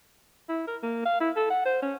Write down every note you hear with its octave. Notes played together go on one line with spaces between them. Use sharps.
E4
A#4
A#3
F5
E4
A4
F#5
C5
C#4